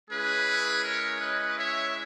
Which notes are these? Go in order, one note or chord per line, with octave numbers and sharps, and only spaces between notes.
G#3 C#4 E4 G#4 B4
A#4 C#5
B4 D#5
C#5 E5